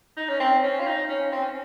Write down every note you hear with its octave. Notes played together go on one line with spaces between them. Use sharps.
D#4
C#4
C4
C#4
F4
D#4
C#4
C4
C#4